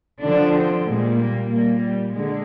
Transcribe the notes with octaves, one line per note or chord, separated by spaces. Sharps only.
D3 F3 D4
C4
A#2 G3 G#3
A#3
A#2 G3 A#3
G3
D3 G#3